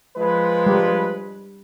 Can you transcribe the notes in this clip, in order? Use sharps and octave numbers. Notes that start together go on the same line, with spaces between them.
F3 G#3 B4
G3